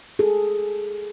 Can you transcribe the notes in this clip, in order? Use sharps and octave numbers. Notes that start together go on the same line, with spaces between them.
G#4 A4